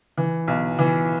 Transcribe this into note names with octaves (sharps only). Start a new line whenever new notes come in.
E3
B1
E3